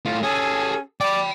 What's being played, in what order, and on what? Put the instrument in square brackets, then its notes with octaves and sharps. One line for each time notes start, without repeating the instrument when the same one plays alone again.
[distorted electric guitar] A2 F4
[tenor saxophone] C#4 [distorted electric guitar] G#4 A4
[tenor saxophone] D5 [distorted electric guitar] G5 B5